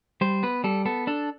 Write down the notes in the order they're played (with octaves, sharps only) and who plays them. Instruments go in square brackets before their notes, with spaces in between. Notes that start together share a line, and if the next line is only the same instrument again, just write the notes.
[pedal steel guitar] G3 C5
B3 B4
G3 A4
B3 A4
D4 A4